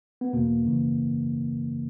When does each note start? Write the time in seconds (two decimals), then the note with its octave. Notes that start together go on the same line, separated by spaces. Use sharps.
0.21 B3
0.33 E2 B2 A#3
0.63 F#2 C#3 E3